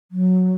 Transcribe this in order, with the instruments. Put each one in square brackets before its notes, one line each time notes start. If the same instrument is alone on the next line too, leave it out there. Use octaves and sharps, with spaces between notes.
[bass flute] F#3